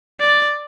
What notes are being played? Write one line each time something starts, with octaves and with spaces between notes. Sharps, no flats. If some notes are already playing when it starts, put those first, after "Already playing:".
D5